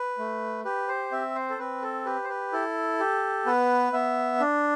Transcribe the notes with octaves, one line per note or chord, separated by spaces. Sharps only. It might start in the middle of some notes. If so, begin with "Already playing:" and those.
Already playing: B4
A3
G4 B4
C5
C4 E5
C5
A4
C4 B4
A4
G4 B4
C5
B4
E4 A4
G4
B3 B4
B3 E5
D4